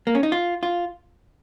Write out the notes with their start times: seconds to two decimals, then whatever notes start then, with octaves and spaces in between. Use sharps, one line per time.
0.07 A#3
0.15 C#4
0.23 D#4
0.32 F4
0.63 F4